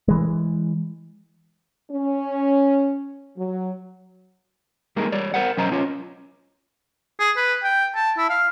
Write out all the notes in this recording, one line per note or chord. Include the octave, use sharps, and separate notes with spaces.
E3 G#3
C#4
F#3
G3 G#3 A#3 D#4 G#4 A#4
G3 C#5 D5
A#4 C5 F#5
B1 F#3 C#4 C5 D#5 A#5
C#4 F4 C#5
G#4
B4
G5
A5
E4
F5